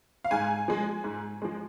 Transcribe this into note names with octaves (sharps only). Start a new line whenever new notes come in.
F5
G#2 G#5
F3 G#3
G#2
F3 G#3